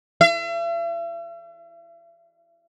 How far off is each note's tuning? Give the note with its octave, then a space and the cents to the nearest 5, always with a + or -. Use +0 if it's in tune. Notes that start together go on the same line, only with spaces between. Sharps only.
E5 +45